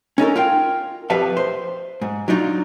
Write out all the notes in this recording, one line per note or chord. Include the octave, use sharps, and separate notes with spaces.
C#4 D#4 A4 A#4
F4 A#4 G5
F2 G4 B4 E5 F5 A5
C5
G#2
F#3 D4 D#4 F4